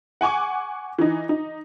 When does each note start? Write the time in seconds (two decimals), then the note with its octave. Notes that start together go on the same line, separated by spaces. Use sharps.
0.21 F#5 G#5 C#6 D6
0.99 E3 D#4
1.29 D#4